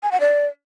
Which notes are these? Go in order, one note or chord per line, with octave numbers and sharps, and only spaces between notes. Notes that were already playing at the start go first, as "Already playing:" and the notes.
G#5
F#5
D5